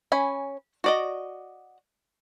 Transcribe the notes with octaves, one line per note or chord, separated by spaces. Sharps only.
C#4 G#5 B5
F#4 D5 D#5